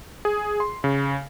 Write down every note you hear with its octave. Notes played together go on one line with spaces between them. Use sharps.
G#4
C6
C#3